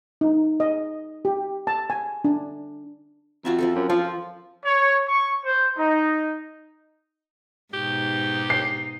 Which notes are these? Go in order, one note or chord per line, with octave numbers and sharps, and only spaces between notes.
D#4
D#5
G4
A5
G#5
D4
F2 F4 F#4 E5
F3 C4 A4
F#2
F3 F4
C#5
C#6
C5
D#4
G#2 B2 D#4 G4
C7